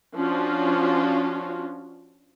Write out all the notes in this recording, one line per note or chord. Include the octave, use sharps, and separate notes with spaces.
F3 C#4 D4 F4 F#4